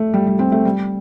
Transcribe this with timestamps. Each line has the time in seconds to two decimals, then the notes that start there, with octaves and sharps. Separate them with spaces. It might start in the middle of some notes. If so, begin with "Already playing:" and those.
Already playing: A3
0.14 G3
0.27 G3
0.39 C4
0.52 A3
0.65 G3